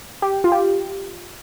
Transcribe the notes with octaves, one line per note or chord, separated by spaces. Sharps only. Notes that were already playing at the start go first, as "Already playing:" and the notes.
G4
F4
G4